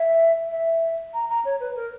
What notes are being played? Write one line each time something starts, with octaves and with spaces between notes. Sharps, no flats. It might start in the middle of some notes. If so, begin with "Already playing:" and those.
Already playing: E5
E5
A#5
A#5
C#5
B4
A#4